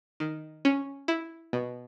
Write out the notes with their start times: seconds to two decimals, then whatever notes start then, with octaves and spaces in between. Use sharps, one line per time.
0.20 D#3
0.65 C#4
1.08 E4
1.53 B2